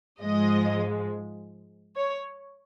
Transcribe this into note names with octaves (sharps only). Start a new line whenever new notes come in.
G#2 F3 G#3 D#5
C#5